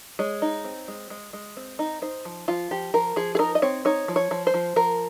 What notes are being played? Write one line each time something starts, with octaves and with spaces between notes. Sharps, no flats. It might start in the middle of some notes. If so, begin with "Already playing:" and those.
G#3 C#5
D#4
C4
G#3
G#3
G#3
C4
D#4
D#4 C5
F3
F3 F4
F3 G4
F3 A#4
F3 G#4
G#4
D#4 A#4
D#5
C4 C#5
D#4 C#5
F3
C#5
F3
C5
F3
F3 A#4